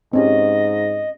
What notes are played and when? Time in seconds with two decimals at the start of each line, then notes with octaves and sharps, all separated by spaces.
0.13 G#2 C4 C#4 G4 D#5